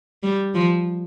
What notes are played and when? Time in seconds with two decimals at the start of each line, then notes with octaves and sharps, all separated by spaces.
0.23 G3
0.55 F3